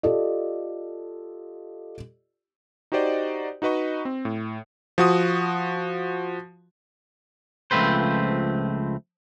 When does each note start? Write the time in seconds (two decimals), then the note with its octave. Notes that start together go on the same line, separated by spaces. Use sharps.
0.03 F4 G4 A4 D5 D#5
2.92 D#4 F#4 G4 C5 D5 D#5
3.62 D#4 F#4 B4 D#5 C#6
4.05 C4
4.25 A2
4.98 F3 F#4 D#6
7.71 C#2 F3 A3 C4 B4 C5